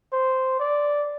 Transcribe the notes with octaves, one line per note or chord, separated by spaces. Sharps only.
C5
D5